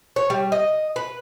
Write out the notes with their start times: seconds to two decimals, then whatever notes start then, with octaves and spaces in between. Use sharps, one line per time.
0.16 C#5
0.30 G3
0.52 D#5
0.96 B4